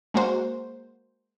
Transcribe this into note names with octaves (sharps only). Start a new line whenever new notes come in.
G#3 A#3 F#4 C5